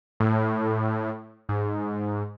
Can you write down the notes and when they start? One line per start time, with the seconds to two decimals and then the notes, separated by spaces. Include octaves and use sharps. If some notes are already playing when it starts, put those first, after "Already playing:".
0.20 A2
1.49 G#2